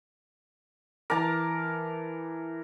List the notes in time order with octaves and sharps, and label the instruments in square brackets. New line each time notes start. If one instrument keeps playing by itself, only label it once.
[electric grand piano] E3 D6 [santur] A#4 A5 A#5